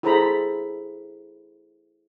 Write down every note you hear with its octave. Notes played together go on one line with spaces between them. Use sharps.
E4 G#4 A4 C5 A#5 B5